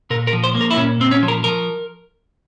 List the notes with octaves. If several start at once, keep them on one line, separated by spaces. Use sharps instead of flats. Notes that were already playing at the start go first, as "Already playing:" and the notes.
A#2 A#4
A#4
F3
C5
A#3
A#4
E4
A#2 C#4
A#2 C4
C#4
F3
A#4
F3 A#4